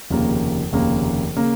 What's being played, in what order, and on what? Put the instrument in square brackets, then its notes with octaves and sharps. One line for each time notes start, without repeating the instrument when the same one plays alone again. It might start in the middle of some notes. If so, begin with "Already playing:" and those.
[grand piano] F1 D#2 C#3 A#3
F1 D#2 C#3 A#3
C#3 A#3